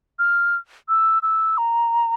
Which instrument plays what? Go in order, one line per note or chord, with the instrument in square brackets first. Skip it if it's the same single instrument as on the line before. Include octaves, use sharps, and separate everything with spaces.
[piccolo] F6
E6
E6
A#5